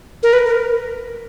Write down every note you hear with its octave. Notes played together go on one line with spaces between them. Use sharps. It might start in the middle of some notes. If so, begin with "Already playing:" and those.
A#4
B4
A#4